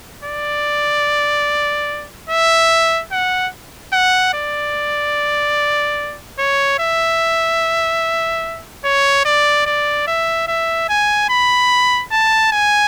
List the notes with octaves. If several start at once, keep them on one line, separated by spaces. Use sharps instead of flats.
D5
E5
F#5
F#5
D5
C#5
E5
C#5
D5
D5
E5
E5
G#5
B5
A5
G#5